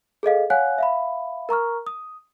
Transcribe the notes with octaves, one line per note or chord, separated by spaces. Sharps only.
G#4 A4 D#5 F5
C#5 F5 F#5 G#5 F#6
E5 F5 B5
A#4 A#5 C#6 F6
D#6